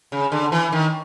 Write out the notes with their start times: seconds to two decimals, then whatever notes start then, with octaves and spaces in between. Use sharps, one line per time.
0.12 C#3
0.32 D3
0.52 E3
0.72 D#3